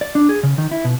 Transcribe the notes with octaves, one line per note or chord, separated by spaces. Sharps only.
D5
D4
G#4
C#3
D#3
E4
B2